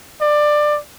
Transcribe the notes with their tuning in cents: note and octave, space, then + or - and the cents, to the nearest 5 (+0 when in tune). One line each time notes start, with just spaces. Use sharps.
D5 +20